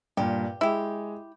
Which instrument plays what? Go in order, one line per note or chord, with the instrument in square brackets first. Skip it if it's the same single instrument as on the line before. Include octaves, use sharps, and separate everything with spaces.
[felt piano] G2 A#2 [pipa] G4
[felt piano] G#3 [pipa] E4 G4